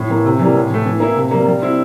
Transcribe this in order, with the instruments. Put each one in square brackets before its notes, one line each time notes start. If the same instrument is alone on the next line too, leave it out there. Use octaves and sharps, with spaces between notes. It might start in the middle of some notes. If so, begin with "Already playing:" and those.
Already playing: [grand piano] A2
E3 A#3
C3
E3 G3 A#3
A2
E3 A3
E3
A#3 E4
C3
G3 A#3
G3
C4 E4